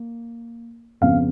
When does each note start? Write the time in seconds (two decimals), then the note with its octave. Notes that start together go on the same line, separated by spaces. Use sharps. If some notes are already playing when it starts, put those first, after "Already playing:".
Already playing: A#3
1.01 F2 C#3 F3 B3 F5